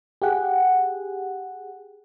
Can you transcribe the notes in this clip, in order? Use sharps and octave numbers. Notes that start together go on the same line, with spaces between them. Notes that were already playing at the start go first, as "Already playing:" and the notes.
G4 G#4 F#5